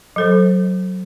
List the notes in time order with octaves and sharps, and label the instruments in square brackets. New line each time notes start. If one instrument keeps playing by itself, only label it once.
[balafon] F#3 A4 C5